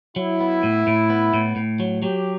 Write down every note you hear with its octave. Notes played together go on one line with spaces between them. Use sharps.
F#3 E4
B3
A2
A2
B3
A2
A2
F#3
F#3 G4